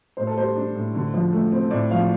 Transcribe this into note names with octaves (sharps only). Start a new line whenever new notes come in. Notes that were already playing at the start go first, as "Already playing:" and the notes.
A2 C5
A4
G3 C5
D4
A2
D3
F3
A3
C4
A2 D5
F3 F5